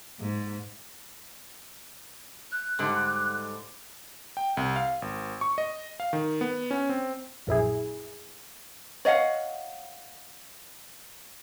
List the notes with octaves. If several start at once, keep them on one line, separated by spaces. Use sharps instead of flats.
G#2
F#6
G#2 D3 G3
G5
C2
F5
G#1
C#6
D#5
F5
D#3
B3
C#4
C4
A#1 F#2 E4 G#4
C#5 D#5 F5 F#5